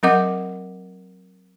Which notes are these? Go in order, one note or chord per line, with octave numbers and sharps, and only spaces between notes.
F#3 C4 A#4 D#5 F#5 D6